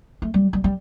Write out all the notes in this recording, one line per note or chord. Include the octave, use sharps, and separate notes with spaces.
A3
G3
G3
G3